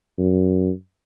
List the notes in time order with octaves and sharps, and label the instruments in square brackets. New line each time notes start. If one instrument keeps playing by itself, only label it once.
[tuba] F#2